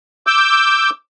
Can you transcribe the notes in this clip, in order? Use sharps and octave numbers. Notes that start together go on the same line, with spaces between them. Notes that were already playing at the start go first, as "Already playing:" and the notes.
D6 E6 G6